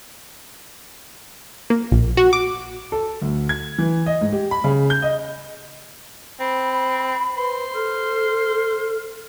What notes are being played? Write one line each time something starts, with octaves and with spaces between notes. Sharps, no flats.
A#3
A#1
F#4
D6
A4
D2
G#6
E3
D#5
G#2
G4
B5
C#3
G6
D#5
C4 B5
B4 C5
A4 F6